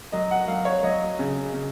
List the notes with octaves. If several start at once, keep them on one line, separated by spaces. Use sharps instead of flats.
F#3 D#5
F#5
F#3 F5
C#5
F#3 D#5
C#3
C#3